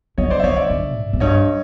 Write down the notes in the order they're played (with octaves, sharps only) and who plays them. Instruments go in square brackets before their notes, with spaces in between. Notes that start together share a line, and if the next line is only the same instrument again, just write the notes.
[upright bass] D3 [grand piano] C#5 D#5
[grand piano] C5 D5
E5
[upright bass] D3 [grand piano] C#5 D#5
[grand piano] D5 E5
[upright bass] D3
G#2
G#2
[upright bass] G2 [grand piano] C#5 D#5